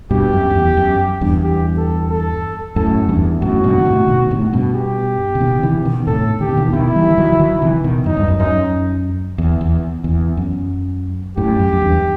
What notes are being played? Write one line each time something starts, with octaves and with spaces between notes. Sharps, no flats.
G2 B2 G4
F#2
F#2
E2
F#2
E2 G2
G4
A4
A4
F#2 A2 A4
E2 G2
F#2 A2 F#4
G2 B2
D#3
A2 C3
B2 D#3
A2 C3
G2 B2
G4
C3
B2 D#3
C3 E3
B2 D#3
A2 C3 A4
D#3 G4
C3
B2 D#3
E3
B2 D#3 E4
E3 G3
E3
D#3 F#3
E3
D#3 F#3
C3 E3
B2 D#3
F#2 D#4
G2
F#2
F#2 D#4
E2
E2
E2
F#2
F#2 A2 G4
F#2
F#2
E2 G2